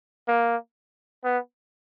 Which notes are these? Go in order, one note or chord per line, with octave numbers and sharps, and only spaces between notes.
A#3
B3